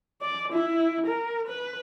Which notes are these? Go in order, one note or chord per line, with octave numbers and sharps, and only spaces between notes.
D5
E4
A#4
B4